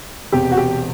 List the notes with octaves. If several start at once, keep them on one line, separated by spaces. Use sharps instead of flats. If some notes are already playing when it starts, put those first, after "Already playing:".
E1 E2 C3 G4
F#4
G4